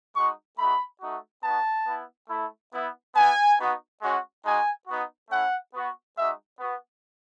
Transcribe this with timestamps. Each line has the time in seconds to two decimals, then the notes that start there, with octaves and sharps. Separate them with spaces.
0.15 G#3 D#4 F#4 C#6
0.58 A3 D#4 F#4 B5
1.02 A3 D#4 F#4
1.44 B3 D#4 F#4 A5
1.87 B3 E4
2.30 A3 E4
2.73 B3 E4
3.15 B3 E4 G#5
3.59 B3 D#4 F#4
4.01 G#3 C#4 F#4
4.45 G#3 D#4 F#4 G#5
4.88 B3 D#4 F#4
5.30 A3 C#4 E4 F#5
5.73 B3 F#4
6.17 G#3 D#4 F#4 E5
6.60 B3 F#4